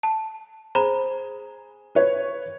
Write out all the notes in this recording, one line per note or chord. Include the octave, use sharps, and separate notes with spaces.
A5
G#4 C5 A#5 B5
B4 C#5